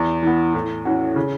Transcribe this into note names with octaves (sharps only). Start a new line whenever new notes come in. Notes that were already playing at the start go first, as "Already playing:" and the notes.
Already playing: E2
E3 B3
A2
E3 C#4 F#4
C#3